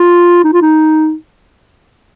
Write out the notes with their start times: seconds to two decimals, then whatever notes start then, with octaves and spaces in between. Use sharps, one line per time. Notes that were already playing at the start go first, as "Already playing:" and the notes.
Already playing: F4
0.44 D#4
0.53 F4
0.62 D#4